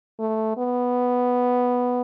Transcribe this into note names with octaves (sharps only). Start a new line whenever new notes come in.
A3
B3